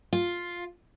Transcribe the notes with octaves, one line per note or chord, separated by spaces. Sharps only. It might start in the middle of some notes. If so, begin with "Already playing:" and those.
F4